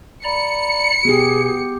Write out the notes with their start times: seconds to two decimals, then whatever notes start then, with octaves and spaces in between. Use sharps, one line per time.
0.24 D5 A#5 B5 C#7
1.05 B2 B3 G4 G#4